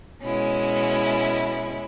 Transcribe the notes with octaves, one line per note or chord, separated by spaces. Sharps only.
B2 G#3 C#4 E4